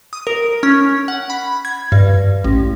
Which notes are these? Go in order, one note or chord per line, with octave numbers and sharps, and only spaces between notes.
D#6
A#4
C#4
F#5
B5
G#6
G2
A1